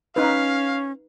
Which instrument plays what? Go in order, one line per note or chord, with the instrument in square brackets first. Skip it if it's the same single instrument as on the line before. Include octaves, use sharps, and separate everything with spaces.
[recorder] C#4 [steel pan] D#4 B4 [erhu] F5